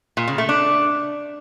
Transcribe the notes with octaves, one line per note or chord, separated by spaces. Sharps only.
A#2
C#3
A3
D4